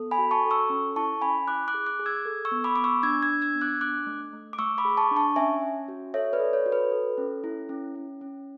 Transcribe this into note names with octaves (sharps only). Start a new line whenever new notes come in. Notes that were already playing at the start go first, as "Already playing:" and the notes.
Already playing: B3 A4
G#5 B5
F#4
A5 C#6
A4
C#6 E6
C#4
E4 A5 C#6
C#4 G#5 B5
E4 D6 F#6
D6 F#6
G#4
D6 F#6
G#4
E6 G#6
A4
C#6 E6
B3
B5 D6
B3 D6
C#6 E6
D4 E6 G#6
E6 G#6
D4
E6 G#6
B3
D6 F#6
D4 D6 F#6
A3
A3
D6
A3 C#6 E6
B5 D6
G#4
A5 C#6
D4
A5 C#6
C#4 E5 G#5
C#4
F#4
A4 C#5 E5
B4 D5
A4
C#5
F#4
B4
A4
C#4
E4
C#4
C#4
C#4